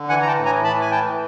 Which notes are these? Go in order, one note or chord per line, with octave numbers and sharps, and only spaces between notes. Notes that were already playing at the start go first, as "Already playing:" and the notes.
Already playing: D3
E3 F#5 G#5
A#5
G5 A5
A2
G#5 A#5
E3 A5 B5
G#5
E3 G5 A5